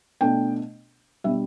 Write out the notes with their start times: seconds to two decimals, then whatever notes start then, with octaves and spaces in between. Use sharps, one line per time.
0.21 B2 A3 D4 G5
1.24 B2 G3 D4 E5